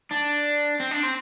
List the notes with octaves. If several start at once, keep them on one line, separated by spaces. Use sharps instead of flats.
D4
C4
D4
C4